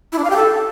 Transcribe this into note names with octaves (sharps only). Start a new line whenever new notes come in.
E4
D4
F5
G4
A4